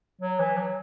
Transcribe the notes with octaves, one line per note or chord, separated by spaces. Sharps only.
F#3
E3
F#3